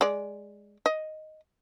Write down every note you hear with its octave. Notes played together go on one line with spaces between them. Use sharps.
G#3 D5
D#5